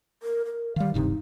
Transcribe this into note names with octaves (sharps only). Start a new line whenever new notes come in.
A#4
A#4
D#3 G3 F5
D#1 G2 C3 D#4